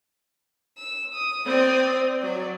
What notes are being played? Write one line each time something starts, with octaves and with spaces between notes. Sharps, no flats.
E6
D#6
C4 D5 D#6
F#3 D5